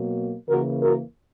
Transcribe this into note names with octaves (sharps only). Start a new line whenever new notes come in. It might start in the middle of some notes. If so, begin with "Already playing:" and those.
Already playing: B2 F#3 A#3
C#3 E3 A#3 F#4 A#4
F#4 A#4